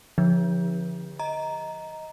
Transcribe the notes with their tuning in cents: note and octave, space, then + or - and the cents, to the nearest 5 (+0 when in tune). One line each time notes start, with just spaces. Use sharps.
D3 -15 F3 +0
D#5 +15 A#5 +0